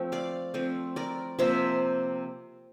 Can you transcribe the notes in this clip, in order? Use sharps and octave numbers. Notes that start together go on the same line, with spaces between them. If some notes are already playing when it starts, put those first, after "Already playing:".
Already playing: F3 A3 C4 G5
D5 F5
F3 A3 C4
A#4 D5
C3 F3 A#3 C5 E5